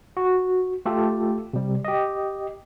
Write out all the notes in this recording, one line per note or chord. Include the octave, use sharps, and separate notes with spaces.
F#4
A3 F4 G4 A4
C3 G3
G4 D#5